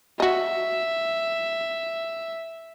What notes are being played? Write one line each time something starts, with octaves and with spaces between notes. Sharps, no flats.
F#4 D#5 E5